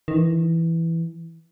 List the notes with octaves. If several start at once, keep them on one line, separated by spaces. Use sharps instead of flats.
D#3
E3